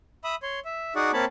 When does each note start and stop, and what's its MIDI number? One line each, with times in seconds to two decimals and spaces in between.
0.24 0.35 76
0.24 0.35 83
0.24 0.35 87
0.43 0.60 73
0.43 0.60 84
0.65 0.94 76
0.96 1.11 63
0.96 1.11 66
0.96 1.11 68
0.96 1.11 74
0.96 1.11 78
1.13 1.25 58
1.13 1.25 60
1.13 1.25 73
1.13 1.25 81
1.13 1.25 83